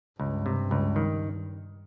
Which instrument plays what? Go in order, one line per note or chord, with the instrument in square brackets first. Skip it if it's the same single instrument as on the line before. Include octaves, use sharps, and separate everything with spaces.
[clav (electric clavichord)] C#2 [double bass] G2
[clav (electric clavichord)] C3
C#2
D#3